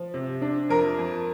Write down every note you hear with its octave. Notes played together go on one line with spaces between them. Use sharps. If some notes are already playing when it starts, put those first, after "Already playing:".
Already playing: F3
C3
D4
F2 A#4
F2